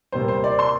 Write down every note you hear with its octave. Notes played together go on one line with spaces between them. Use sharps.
C3 G3 A#3 C5
C5
D5
C6